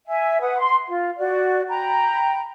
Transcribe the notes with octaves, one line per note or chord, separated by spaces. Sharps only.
E5 G#5
B4 F#5 D#6
C6
F4
F#4 D5
G5 A#5 B5